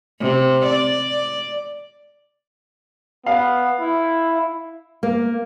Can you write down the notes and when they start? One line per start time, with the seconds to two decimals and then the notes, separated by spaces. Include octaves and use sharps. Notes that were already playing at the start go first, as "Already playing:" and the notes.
0.21 C3
0.66 D5
3.26 B3 F5
3.81 E4
5.03 A#3